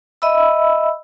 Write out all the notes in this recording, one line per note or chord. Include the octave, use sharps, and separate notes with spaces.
D#5 E5 B5 E6